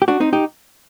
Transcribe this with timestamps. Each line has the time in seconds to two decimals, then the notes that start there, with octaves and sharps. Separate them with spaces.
0.02 G4
0.08 D4 F#4
0.20 C4 D#4
0.33 D#4 G4